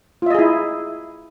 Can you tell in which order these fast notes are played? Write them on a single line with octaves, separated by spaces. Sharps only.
F4 E5 D#5 G#4 E4